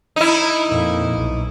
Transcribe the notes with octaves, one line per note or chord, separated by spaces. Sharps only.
D#4 E4
F2 A#2
B1